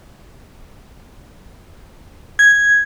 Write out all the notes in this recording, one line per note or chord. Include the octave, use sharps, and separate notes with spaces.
G#6